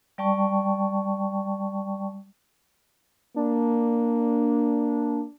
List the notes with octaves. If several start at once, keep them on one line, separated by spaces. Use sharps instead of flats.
G3 D5 G5 A5 C#6
A#3 D4